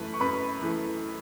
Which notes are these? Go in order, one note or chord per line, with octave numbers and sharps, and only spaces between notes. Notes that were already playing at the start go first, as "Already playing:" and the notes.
Already playing: F#2 E3 A3 B4
C#6
F#2 B4 B5
E3 A3